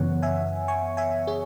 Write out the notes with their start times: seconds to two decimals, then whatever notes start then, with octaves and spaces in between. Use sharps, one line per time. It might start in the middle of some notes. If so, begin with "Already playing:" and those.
Already playing: F#2 C#3 E3 B3 C#5 F#5
0.22 E5 G#5
0.68 G#5 C#6
0.97 E5 G#5
1.27 G#4 C#5